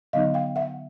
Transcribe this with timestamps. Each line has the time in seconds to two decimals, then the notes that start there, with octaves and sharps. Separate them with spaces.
0.13 D3 F#3 B3 D#4 D#5 F5
0.34 F5 G5
0.56 E5 F#5